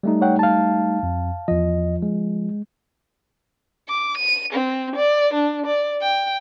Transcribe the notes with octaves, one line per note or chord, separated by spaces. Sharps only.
G3 A3 D#4
C#5 F#5 G5
F5 A5
F2
E2 F3 D#5
G#3
D6
D#7
C4
D5
D4
D5
G5